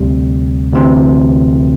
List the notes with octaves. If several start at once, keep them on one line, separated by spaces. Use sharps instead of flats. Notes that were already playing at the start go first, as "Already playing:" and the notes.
Already playing: D2 C3 G3
D2 C3 E3